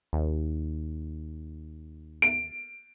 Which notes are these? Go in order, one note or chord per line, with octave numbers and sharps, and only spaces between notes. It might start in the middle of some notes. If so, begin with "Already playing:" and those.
D#2
D7